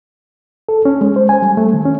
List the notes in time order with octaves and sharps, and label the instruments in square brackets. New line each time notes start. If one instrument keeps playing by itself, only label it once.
[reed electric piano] A4
C#4
G#3
C5
G#5
G3
A3
D#3
C#4